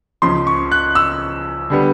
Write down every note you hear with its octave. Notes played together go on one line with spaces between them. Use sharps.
C#2 C#3 F3 C6
C#6
F#6
E6
D3 G3 B3